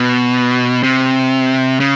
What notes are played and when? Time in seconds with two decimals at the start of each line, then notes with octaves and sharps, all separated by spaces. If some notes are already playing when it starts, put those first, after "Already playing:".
Already playing: B2
0.83 C3
1.80 C#3